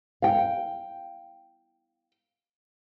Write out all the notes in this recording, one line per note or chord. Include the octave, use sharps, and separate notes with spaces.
F5 G5